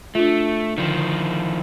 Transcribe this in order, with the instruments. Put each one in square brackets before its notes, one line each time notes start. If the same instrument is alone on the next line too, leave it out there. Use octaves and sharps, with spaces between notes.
[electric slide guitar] A3 [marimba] D4 F4
[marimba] D3 [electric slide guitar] D#3 F3